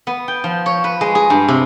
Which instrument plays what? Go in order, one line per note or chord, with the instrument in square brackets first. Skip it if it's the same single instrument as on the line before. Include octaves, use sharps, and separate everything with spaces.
[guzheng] B3
G5
F3
C#5
B4
G#3
G#4
G2
C3